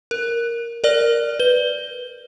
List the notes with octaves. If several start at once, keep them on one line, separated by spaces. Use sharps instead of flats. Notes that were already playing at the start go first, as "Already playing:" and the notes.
A#4
A#4 D5 F6
B4 G7